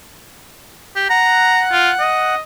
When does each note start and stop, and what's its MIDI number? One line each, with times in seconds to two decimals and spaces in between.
0.96 1.06 67
1.10 2.35 78
1.10 1.63 82
1.10 2.35 90
1.72 1.91 65
1.99 2.40 75